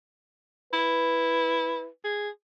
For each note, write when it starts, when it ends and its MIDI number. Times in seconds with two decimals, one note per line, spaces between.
0.73 1.87 64
0.73 1.90 71
2.04 2.29 68